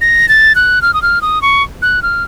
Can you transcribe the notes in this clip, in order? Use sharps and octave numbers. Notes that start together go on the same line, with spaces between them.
A#6
A6
F#6
F6
D#6
F6
D#6
C#6
F#6
F6